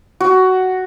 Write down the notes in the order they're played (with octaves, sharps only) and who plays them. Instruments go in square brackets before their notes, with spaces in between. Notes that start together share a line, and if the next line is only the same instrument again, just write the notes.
[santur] F#4